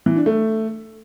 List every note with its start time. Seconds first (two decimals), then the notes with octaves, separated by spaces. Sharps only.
0.06 E3
0.16 D4
0.26 A3